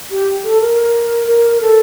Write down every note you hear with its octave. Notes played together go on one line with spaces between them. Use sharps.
G4
A4
A#4
A#4
A4